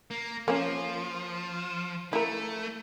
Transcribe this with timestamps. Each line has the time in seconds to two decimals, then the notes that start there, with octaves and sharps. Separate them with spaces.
0.11 A#3
0.48 F3 A#3 C#4
2.13 A3 E4 A#4